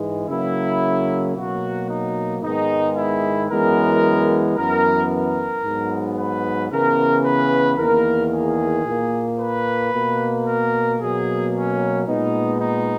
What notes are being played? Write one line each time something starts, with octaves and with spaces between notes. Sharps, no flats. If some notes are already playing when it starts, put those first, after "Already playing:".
Already playing: G#2 E3 G#3
C#3 F#3 A#3 E4
B2 F#3 A#3 F#4
D#4
G#2 D#3 G#3 B3 D#4
E4
F#2 E3 G#3 B3 A#4
F#2 E3 B3 A#4
A#4
G#2 F#3 B3
B4
C#3 E3 B3 A#4
B4
E2 D#3 A#3 A#4
G#4
A#2 A#3
B4
B2 A#3
A#4
B2 F#3 A#3 G#4
C#4
A#2 G#3 B3 D#4
D#4